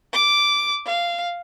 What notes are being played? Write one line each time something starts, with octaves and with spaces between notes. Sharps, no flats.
D6
F5